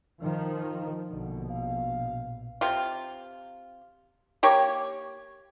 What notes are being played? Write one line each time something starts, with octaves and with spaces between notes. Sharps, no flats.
D#3 F3
A#1 B2 D3
F5
C3 F4
A#3 G4 C#5 C#6